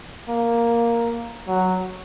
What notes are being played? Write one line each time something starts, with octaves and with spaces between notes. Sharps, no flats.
A#3
F#3